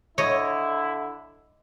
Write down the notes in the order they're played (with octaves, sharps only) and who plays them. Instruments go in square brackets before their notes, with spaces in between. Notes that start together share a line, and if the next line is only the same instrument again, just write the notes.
[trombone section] D3 E4 [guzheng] C#5 D#5